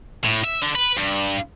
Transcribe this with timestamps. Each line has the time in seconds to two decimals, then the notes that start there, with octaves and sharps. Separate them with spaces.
0.25 A2
0.44 E5
0.62 D3
0.75 B4
0.97 G2